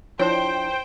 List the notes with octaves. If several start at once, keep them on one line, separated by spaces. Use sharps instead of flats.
F3 D4 E4 C5 C#5 G5